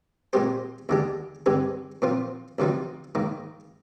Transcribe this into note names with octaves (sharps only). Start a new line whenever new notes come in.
A#2 G#3 C4 G4 C5
D#2 D3 G#3 D4 G4
G2 D3 G#3 C4 G4
A#2 F3 C4 F4
D2 C3 F3 C4 D#4
G#2 D#3 A#3